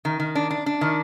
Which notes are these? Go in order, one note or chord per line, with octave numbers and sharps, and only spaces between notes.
D#3
D#3
D4
D4
D4
D#3